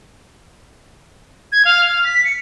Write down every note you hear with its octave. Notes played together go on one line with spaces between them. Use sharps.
G#6
F5
F6
B6
C#7